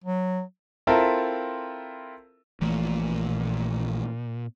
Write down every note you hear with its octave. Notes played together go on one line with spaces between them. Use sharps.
F#3
C4 E4 F4 A4 A#4 E5
A#1 A#2 E3 A3